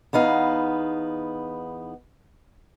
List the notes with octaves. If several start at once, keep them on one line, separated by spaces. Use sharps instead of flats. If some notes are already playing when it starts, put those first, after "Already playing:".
E2 B3 D#4 F5